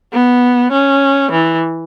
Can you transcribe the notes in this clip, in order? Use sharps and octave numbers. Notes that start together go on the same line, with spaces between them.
B3
C#4
E3